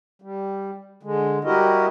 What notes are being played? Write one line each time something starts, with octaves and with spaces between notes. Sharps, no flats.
G3
D3 G#3
G3 E4 F#4 G4 A#4 D#5